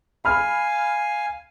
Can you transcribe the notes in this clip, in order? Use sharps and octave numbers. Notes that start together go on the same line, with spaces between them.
F5 G#5 B5 F6